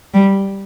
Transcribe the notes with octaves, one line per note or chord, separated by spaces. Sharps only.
G3